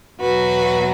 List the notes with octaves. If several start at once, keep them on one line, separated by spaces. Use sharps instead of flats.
E2 B2 F#3 F#4 B4